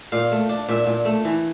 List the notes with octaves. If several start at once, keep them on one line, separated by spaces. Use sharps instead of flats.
A#2 F5
A3
D4
A#2 E5
A#2
A3
E3